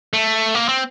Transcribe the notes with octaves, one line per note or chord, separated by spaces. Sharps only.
A3
A#3
C4